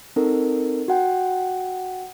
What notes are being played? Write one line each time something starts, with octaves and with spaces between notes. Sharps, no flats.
C4 D#4 A4 A#4
F#4 F#5 G5